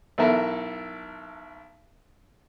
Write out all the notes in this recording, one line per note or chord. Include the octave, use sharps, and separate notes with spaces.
B1 E3 E4 A4 A#4 E5